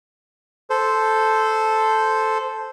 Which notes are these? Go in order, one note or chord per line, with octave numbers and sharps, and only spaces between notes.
A4 C5